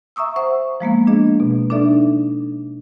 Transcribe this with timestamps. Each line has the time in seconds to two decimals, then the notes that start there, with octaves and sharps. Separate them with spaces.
0.16 E5 A#5 C#6 D#6 E6
0.36 C5 E5 F#5 C#6
0.80 F3 G#3 A#3 B3
1.07 D4 G#4 D#5
1.40 B2
1.70 D4 D#4 A4 D5 E5